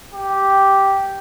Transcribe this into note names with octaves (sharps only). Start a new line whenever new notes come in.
G4